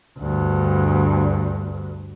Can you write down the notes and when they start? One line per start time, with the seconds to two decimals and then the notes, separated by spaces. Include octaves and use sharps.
0.18 D2 G2